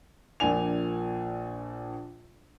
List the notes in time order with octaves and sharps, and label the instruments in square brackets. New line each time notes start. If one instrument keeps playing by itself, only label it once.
[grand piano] A#1 A#2 D4 G#5 F7